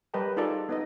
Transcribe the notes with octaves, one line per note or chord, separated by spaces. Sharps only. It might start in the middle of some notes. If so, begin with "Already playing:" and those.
G3 A#4 B4 D#5 G5 A5
D#4 F4 G#4 A4 D5 A5
B3 D#4 D#5